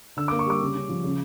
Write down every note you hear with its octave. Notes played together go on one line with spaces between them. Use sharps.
D3 E6
A#3 D6
C#6
G3 D6
C#3
C#4
F3
C#3